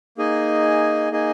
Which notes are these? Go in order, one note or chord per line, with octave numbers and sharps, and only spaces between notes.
A#3 D#4 G#4 D#5 G#5
A#3 D#4 G#4 D#5 G#5